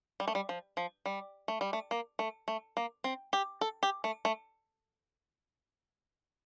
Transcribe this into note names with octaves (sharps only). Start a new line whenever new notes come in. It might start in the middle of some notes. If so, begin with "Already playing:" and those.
G3
A3
G3
F3
F3
G3
A3
G3
A3
A#3
A3
A3
A#3
C4
G4
A4
G4
A3
A3